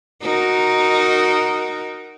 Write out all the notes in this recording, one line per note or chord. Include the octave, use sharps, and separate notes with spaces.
D#4 F#4 A#4